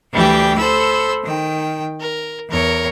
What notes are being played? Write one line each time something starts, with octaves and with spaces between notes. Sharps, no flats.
D2 E3 G3 G4 G5
A4 C5 B5 E6
D#3 G5
A#4
E2 A#4 C#5